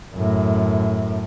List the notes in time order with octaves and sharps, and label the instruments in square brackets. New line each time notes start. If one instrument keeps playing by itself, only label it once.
[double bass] F#2 A2